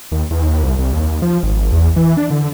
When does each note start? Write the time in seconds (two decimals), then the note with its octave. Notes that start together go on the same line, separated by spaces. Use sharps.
0.12 D#2
0.30 E2
0.42 D#2
0.63 C2
0.78 C2
0.93 D#2
1.22 F3
1.43 G#1
1.72 E2
1.96 E3
2.17 D4
2.30 D3